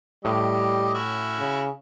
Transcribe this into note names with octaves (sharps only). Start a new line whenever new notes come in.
A2 G3 G4 D#5
C#4 E4 F#4
C#3